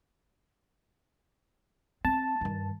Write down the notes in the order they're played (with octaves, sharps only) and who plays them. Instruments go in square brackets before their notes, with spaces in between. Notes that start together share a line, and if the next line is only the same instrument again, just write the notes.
[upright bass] C4 [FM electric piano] A5
[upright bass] G2 D#3